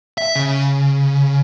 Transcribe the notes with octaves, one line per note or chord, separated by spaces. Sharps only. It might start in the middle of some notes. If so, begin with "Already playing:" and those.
E5
C#3